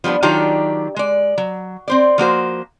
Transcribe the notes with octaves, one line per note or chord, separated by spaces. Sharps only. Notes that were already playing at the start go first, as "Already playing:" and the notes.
F3 G3 B3 D4
D#3 F#3 D4 D#4 F4 G4
G#3 D5
F#3
C4 C5 D5
F3 A#3 F#4 C5